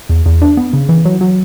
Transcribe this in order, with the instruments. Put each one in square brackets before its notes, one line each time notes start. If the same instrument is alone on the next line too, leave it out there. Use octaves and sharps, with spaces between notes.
[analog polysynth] E2
E2
D4
B3
C#3
E3
F#3
F#3